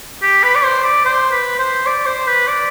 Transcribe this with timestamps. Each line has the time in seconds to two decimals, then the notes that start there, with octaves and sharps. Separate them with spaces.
0.22 G4
0.43 B4
0.55 D5
0.64 C5
0.84 D5
1.05 C5
1.31 B4
1.58 C5
1.86 D5
2.06 C5
2.27 B4
2.47 D5